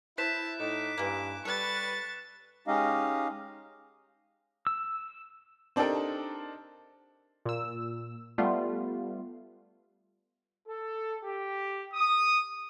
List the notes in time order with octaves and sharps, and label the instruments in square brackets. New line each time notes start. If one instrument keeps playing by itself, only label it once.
[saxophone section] E4 [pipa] C5 [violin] A5 [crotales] F#6 B6 E7
[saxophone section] A2 D#4 [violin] D6
[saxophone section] G2 [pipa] E3 A#3
[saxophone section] G3 B4 [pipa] A4 [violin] C#6 A6
[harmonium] G#3 C#4 D#4 G4 D#5 F5
[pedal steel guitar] E6
[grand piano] C4 D4 D#4 G4 A4 A#4
[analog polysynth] A#2 E6
G3 A3 B3 F4
[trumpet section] A4
G4
D#6